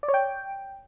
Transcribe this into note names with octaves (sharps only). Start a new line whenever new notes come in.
D5
C#5
G5